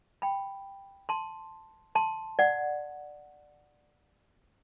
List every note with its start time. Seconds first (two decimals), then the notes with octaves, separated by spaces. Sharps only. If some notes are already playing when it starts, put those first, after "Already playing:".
0.22 G5 B5
1.09 A5 C6
1.95 A5 C6
2.39 D5 F#5